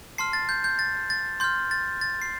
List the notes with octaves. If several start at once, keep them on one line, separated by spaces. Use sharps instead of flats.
A5 C6 F6 C7
A6
G6
G6
A6
A6
C6 F6 G6
A6
A6
C7